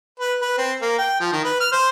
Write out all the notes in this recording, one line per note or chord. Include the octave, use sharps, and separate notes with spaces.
B4
B4
C4
A#3
G5
F3
D#3
B4
F6
C5